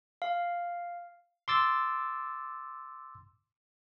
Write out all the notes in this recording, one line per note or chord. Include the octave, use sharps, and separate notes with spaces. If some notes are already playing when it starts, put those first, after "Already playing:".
F5
C6 D6 E6 A6